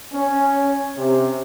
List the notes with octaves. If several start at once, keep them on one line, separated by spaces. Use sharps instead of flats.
C#4
C3